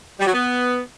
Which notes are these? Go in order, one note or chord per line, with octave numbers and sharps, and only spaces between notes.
G3
F#3
B3